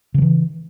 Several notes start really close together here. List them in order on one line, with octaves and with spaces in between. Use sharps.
C#3 F3 E3